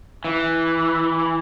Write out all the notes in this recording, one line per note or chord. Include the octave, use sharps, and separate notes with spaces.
E3